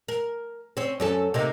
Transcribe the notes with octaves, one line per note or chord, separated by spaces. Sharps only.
A#4
C4 C#4
F#2 C#4 A4
C3 A#3 D#4